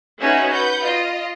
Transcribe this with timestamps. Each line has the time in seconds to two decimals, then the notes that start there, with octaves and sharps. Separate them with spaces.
0.20 C#4 D#4 F#4 G#4 B4 E5
0.50 B4 F#5 G6
0.83 F4 D#5